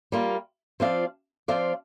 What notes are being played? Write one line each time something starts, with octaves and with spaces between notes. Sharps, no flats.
G3 A#3 F4
F3 C4 F4 D5 F5
F3 C4 F4 D5 F5